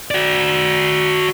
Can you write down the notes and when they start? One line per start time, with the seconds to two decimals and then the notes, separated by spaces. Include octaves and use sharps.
0.11 F#4 D5